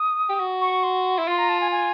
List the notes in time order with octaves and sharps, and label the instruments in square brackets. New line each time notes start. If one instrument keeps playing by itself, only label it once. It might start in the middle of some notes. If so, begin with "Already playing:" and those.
Already playing: [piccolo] D#6
[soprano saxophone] G4
F#4
[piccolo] C#6
C6
[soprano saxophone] E4
[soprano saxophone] F4 [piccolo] C6
[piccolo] A#5
A5
G#5
G#5